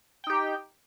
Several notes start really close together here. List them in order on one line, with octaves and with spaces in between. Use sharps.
G5 D#4 G4